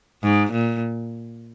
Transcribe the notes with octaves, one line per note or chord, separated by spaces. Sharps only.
G#2
A#2